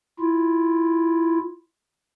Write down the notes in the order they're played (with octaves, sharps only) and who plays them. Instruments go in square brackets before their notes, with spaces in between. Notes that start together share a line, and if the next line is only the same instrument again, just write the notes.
[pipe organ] E4 F4